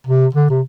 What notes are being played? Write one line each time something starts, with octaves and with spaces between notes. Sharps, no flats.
C3
D3
C3